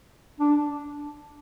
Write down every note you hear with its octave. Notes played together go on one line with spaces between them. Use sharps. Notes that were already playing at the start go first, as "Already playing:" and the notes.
D4